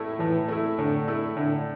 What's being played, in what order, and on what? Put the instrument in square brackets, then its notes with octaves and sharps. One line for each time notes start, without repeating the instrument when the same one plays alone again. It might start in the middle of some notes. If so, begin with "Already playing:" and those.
Already playing: [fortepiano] A2 A3 E4
[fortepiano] A2 [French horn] E3
[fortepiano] A3 E4
[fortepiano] A2 [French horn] D3
[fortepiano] A3 E4
[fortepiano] A2 [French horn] D3